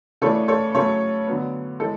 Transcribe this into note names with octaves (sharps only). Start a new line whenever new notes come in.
C#3 E3 A3 D4 A4 C#5
A4 C#5
C#3 F#3 A3 C#4 A4 C#5
D3 F#3 B3
E3 G#3 A4